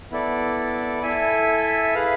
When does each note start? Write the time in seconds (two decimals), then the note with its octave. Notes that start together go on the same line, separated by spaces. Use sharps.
0.11 B3 E4 A4 D5
1.03 E4 A4 E5 G#5
1.94 G#4 B4 F5